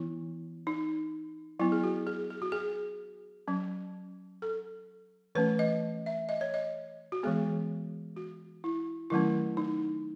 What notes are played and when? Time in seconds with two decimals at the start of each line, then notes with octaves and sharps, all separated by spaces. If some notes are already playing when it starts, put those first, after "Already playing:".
Already playing: E3 B3 E4
0.67 D#4
1.59 F#3 B3 E4
1.72 G#4
1.84 F#4
2.07 G#4
2.30 G#4
2.42 F#4
2.52 G#4
3.48 F#3 C#4
4.42 A4
5.35 E3 A3 C#4 B4
5.59 D#5
6.06 E5
6.29 D#5
6.41 C#5
6.54 D#5
7.12 F#4
7.23 E3 G#3 B3 G#4
8.16 F#4
8.64 E4
9.10 D#3 F#3 A3 C#4 E4
9.57 D#4